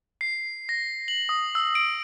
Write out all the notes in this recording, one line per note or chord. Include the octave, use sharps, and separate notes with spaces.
C7
A#6
F#7
D#6
E6
D7